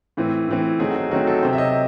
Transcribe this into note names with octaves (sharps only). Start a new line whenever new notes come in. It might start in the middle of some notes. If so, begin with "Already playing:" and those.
A2 E3 C4
A2 E3 C4
D#3 F#3 A3 C4 G#4
F#4
G#4
D#3 F#3 A3 C4 F#4
A4
C3 F#3 C4 C5
E5
D#5